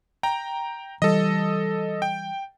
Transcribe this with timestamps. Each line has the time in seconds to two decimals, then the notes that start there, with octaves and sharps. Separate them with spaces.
0.23 G5 A#5
1.02 E3 G3 A4 D#5
2.02 G5